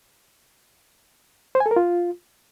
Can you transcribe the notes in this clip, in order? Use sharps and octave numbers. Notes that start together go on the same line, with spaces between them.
C5
G#5
A4
A#4
F4